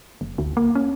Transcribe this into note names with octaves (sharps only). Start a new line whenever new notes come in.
F#1
D2
A#3
C#4